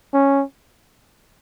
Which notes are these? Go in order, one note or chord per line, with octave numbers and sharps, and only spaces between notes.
C#4